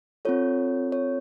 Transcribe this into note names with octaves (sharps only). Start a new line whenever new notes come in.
C4 F4 A4 C#5
C#5